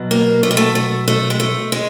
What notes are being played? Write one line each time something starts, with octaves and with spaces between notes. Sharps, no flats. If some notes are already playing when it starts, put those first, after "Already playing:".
Already playing: B2 F#3
A#3
A3
A#3
A3
A3
A3
G#3
A3
G#3